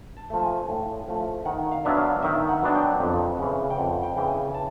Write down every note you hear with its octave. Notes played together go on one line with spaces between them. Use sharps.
A5
F3 A3
G#5
A2
F3 A3
D#3 F#5
F5
F#3 B3 D4 E5
F5
D#3 E5
F#5
F#3 B3 D4
G5
F2
C#3 E3
G5
F2 F#5
G5
C#3 E3 G5
G#5
A5